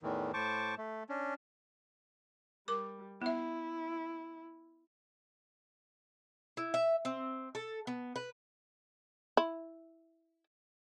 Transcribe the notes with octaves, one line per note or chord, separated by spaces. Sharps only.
E2 A2 D#3 E3
A2 C5 A5 C#6 D6
A3
C#4 D4
G3 A#4 D6
B3 E4 E5
E4
E5
C4
A4
B3
B4
E4